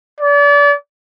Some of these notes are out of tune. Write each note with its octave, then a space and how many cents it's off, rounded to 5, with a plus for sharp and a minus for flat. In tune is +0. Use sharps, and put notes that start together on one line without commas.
D5 -35